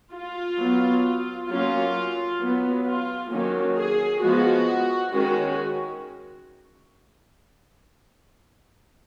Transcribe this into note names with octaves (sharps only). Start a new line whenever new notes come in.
F4
F#3 B3
F#3 A#3 C#4 F4
F#3 B3
F4
D#3 F#3 A#3 C#4
G#4
F3 G#3 B3 F#4
D#3 G#3 C#4 F#4